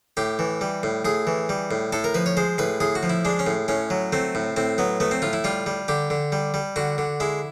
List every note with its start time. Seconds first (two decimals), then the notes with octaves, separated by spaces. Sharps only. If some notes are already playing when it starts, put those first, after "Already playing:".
0.17 A2 G4
0.39 E3
0.61 G3
0.83 A2
1.05 A2 G#4
1.27 E3
1.49 G3
1.71 A2
1.92 A2 A4
2.04 A#4
2.14 F3 B4
2.26 C#5
2.37 G#3 C5
2.58 A2 B4
2.80 A2 G#4
2.95 F#4
3.03 F3
3.10 E4
3.25 G#3 D4
3.39 C#4
3.47 A2
3.68 A2 C#4
3.90 F#3
4.13 A3 C4
4.35 A2
4.56 A2 C4
4.78 F#3 B3
5.00 A3 B3
5.11 C4
5.22 A2 F4
5.33 E4
5.44 G3 F4
5.66 G3
5.88 D3 G4
6.10 D3
6.32 G3
6.54 G3
6.76 D3 F#4
6.98 D3
7.20 G#3 E4